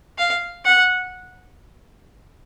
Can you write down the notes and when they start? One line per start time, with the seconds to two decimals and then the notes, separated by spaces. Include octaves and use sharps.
0.18 F5
0.65 F#5